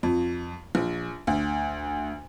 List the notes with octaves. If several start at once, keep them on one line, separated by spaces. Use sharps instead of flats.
F2
A#1
D2